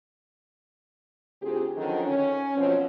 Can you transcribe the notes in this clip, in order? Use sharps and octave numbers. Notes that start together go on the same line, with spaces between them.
D2 C4 F4 G4 G#4
D3 D#3 F3 F#3 C#4 D#4
C#4
B2 F3 F#3 C4 C#5